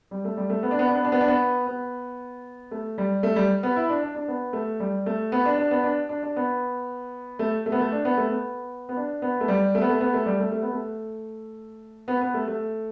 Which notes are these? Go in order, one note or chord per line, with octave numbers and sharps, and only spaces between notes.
G3
A3
G3
A3
B3
D4
B3
D4
B3
D4
B3
D4
B3
B3
A3
G3
A3
G3
B3
E4
D4
D4
D4
B3
A3
G3
A3
B3
D4
D4
B3
D4
D4
D4
B3
A3
A3
B3
A3
D4
B3
A3
B3
B3
D4
B3
A3
G3
A3
B3
A3
B3
A3
G3
A3
A3
B3
A3
B3
B3
A3
A3